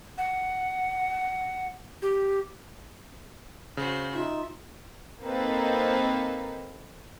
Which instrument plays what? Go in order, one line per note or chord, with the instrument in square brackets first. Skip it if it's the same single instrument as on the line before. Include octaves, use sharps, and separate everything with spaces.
[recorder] F#5
G4
[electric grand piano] C#3 [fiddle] F#4 C5
[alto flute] D#4 [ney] F4 [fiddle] E5
[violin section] A#3 C4 D#4 A4 B4